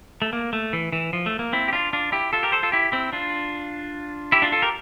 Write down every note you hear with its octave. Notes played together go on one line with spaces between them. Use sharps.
A3
A#3
A3
E3
E3
F3
A3
A#3
C4 E4
G4
D4 F4
D4 F4
E4 G4
F4 A4
G4 A#4
A4 C5
F4 A4
E4 G4
C4 E4
D4 F4
E4 G4
D4 F4
F4 A4
G4 A#4